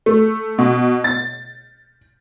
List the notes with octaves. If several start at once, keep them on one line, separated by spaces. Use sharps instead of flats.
A3
B2
A6